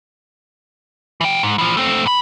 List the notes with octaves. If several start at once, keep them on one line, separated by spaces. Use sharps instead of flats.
E3 G5
G#2
E3 F3
A3 C4
G#2 B5